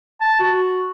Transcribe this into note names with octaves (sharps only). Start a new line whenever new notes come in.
A5
F#4